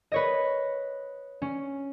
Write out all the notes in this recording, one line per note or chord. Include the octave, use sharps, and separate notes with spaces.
B4 C#5 D#5
C#4